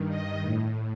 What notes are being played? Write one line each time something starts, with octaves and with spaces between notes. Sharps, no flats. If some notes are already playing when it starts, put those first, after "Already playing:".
Already playing: G2 D#3
D#5
A2